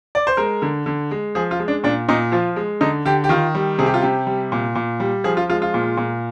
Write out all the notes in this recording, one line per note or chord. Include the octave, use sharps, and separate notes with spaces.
D5
C5
G#3 A#4
D3
D3
G#3
F3 G#4
F4
G#3
D4
A#2 D4
A#2 D#4
F3 F4
G#3
D3 D#4
D3 G4
G4
D#3 F4
G3
C3 G#4
G4
F4
C3 G4
G3
A#2
A#2
G3
F3 G#4
F4
G#3 F4
F4
A#2
A#2